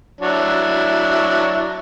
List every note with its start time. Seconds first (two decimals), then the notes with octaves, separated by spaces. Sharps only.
0.21 F#3 D4 E4